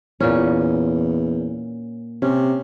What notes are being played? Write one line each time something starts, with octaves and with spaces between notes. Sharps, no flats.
E2 A#2 C#4
C3 C#4